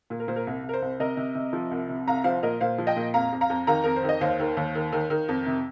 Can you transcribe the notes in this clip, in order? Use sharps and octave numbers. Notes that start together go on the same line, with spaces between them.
A#2
A#4
A#2 C5
A#4
C2
C2
A#4
C5
C2
C3 A#4 D#5
C3
C3
F3
C2
C3
C2 F5 A#5
F3 C5 F5
A#2 A#4 D#5
A#2 C5 F5
F3
D#5 G5
A#2
F2 F5 A#5
F2
F5 A#5
F2
D#3 F5 A#5
F2 A#4
C5
D#3
D#5
D#2 C5 F5
D#3
D#2
D#3
D#3
D#3
F2
C3